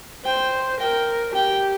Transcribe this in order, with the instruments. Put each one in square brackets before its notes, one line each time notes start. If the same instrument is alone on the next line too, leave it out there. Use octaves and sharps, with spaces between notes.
[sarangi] C5 [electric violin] G5
[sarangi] A#4 [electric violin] G5
[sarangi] G4 [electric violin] G5